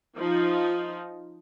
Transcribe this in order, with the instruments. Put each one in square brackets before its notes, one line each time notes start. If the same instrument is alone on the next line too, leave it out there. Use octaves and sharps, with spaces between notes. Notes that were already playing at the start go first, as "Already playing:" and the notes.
[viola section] F3 D#4